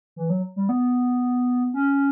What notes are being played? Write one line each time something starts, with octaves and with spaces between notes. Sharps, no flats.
E3
F#3
G3
B3
C#4